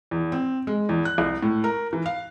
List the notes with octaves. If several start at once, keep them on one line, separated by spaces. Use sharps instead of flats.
E2
C4
G#3
E2
F#6
C2
A2
A#4
E3
F5